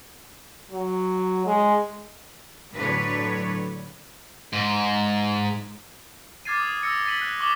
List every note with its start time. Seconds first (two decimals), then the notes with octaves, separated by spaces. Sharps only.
0.71 F#3
1.46 G#3
2.73 A2 D3 F#3 D4 B4 C#5
4.53 G#2
6.45 D6 F6 G#6 A6 C7 D#7
6.60 D#6
6.83 E6 A#6 C#7
7.06 A6 B6 D#7 F#7
7.21 F#6
7.40 C#6 D6 F#7 G7